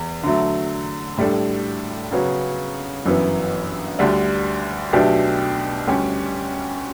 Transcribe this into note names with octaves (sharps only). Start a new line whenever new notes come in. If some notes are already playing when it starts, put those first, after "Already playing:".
Already playing: E2
D3 F#3 A3
A2 G3 D4 A4
C#3 F#3 B3 F#4 C#5
G1 F#2 E3 B3
D2 D3 G3 D4
B1 B2 A3 D4 G4
D2 D3 G3 C#4 G4